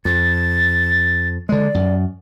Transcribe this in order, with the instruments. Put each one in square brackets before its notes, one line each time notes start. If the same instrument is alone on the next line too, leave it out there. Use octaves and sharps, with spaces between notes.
[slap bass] F2 [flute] A6
[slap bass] D3 G#3 [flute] D5
[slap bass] F#2